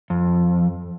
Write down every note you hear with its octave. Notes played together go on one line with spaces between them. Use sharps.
F2